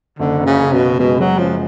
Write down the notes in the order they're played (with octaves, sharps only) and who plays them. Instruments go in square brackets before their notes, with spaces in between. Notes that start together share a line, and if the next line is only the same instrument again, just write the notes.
[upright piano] F#1 [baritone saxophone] D3
[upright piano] F#2
[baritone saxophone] C#3
[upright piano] F#2
[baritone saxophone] B2
[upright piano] F#2
[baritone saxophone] B2 [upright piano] G#3
[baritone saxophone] F#3 [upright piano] G#3
[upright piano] F#2 [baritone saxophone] F3